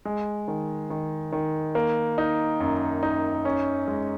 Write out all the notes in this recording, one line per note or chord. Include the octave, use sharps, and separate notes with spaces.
G#3
D#3
D#3
D#3
A#3
D#4
F#2
D#4
C#4
G#3